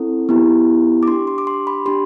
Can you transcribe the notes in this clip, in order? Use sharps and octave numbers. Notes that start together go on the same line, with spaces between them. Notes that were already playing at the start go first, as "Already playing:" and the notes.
Already playing: C4 E4 A4
B3 E4 G4
D6
D4 G4 C6
C6
D6
C6
B5
D4 G4 C6